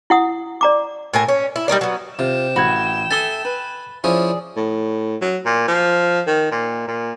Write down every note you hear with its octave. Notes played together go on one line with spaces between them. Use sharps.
E4 F#5 D#6
D5 A#5 D6
A2 A#4 G#5
C#4
E4
G3 D#4 A#4 D5
F#3 B3
C3 F4 G5 E7
A1 F#4 B5 G#6
A4 E5 G#5 D#6 A6 G7
B4
F3 C#4 E4 G#4 D5
A2
F#3
A#2
F3
D#3
A#2
A#2